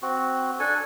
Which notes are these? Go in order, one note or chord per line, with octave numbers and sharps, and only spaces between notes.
C4 F#4
D4 A4 G#5